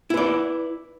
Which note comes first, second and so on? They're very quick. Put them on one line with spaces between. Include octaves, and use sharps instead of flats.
E4 B4 D5